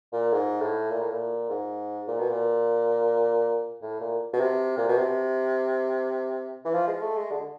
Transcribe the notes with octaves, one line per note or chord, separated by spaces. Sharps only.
A#2
G#2
A2
A#2
A2
A#2
G#2
A#2
B2
A#2
A2
A#2
B2
C3
A#2
B2
C3
E3
F3
G#3
A3
G#3
D3